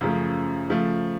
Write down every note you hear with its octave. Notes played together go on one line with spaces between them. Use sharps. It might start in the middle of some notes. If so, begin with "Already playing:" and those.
F#2 C#3 F3 A3
C#3 F3 A3